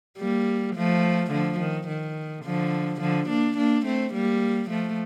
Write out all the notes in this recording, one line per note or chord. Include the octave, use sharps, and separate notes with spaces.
G3 A#3
F3 A3
D3 F3
D#3
D#3
D3 F3
D3 F3
A#3 D4
A#3 D4
A3 C4
G3 A#3
F3 A3